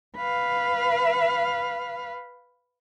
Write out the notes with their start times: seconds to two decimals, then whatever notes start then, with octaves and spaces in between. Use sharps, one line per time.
0.17 B4 F5